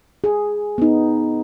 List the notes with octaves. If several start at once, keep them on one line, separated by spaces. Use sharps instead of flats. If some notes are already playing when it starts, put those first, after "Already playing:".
G#4
B3 D#4